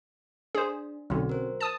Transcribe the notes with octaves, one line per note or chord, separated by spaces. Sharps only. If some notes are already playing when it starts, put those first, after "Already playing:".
D4 G#4 C5
B1 D3 C4 C#4 F#4
A#4 C5
A5 D#6